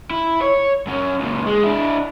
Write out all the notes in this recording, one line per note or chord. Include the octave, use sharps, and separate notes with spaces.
E4
C#5
F#2 C#4
C#2 A#2
G#3
D4 E4